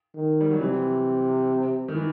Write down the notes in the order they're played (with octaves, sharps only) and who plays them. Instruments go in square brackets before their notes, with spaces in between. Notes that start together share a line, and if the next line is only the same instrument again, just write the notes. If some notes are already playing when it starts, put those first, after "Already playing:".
[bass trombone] D#3
[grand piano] G3
F#3
[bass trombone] C3 [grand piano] E3
[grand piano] D#3
E3